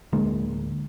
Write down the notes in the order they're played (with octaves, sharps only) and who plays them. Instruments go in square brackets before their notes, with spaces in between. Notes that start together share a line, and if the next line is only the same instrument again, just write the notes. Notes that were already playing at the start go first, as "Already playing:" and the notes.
[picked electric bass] D1 D3 G#3 A#3